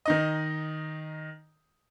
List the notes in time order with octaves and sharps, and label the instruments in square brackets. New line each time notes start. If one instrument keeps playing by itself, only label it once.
[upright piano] D#3 D#4 D#5